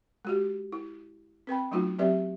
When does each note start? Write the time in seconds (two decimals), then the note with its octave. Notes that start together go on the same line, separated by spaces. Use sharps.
0.25 G#3 F#4 G4
0.72 E4
1.47 C4 B4 G5 B5
1.72 F#3 A3 C#4 D#4 F4 F#4
1.99 F#3 C4 G4 B4 D5 E5